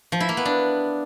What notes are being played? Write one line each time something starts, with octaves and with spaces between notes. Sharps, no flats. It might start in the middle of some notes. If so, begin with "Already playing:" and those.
F3
E4
A#3
B3
D4